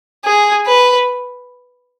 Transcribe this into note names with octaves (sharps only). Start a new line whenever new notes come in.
G#4
B4